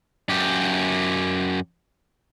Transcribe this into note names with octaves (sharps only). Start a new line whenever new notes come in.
F#2 G4